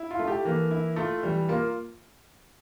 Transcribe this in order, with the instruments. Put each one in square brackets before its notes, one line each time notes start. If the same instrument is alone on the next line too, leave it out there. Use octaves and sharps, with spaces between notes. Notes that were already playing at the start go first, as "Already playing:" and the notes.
Already playing: [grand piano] E4
[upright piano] F4
[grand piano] A3
[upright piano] G4
[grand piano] E3 [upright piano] A#3
[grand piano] E4
[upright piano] A3 [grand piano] F4
[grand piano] E3 [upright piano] G3
[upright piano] A#3 [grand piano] F4